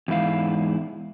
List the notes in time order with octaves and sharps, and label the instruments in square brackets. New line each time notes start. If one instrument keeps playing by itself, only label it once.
[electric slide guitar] E2 G#2 E4 F5